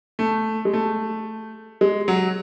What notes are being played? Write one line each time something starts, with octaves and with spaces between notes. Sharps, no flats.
A3
G#3
A3
G#3
F#3